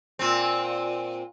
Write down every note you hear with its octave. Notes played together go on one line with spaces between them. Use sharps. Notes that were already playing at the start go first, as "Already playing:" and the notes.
A#2 C4